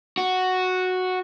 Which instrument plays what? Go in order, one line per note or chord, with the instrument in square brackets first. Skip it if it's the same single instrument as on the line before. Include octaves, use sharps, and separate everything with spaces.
[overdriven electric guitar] F#4